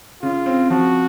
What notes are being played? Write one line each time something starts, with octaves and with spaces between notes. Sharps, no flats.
C#3 F4
C4
F3 F#4